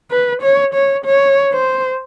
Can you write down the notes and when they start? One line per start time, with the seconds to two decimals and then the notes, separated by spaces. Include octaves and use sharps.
0.11 B4
0.43 C#5
0.74 C#5
1.05 C#5
1.52 C5